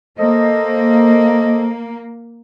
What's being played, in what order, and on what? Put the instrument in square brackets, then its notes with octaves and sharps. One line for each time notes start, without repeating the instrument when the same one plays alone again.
[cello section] A#3 [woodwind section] A4 C5 D#5